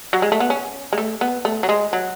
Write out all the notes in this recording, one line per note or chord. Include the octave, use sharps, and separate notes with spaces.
F#3
G#3
A3
B3
C#4
G#3
A3
B3
A3
F#3
G#3
F#3